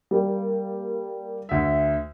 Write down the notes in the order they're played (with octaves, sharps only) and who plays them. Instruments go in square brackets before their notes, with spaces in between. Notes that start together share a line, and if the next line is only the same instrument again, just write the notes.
[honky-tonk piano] G3 A#3
[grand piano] D2 E5